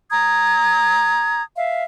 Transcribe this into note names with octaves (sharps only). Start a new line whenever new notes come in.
A#5 D#6 G#6
E5 F5